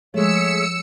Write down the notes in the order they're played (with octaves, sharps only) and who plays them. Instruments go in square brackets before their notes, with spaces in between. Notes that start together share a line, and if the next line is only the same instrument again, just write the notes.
[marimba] F3 [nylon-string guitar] G#3 A3 [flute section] G#4 C#5 E5 [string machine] E6 C#7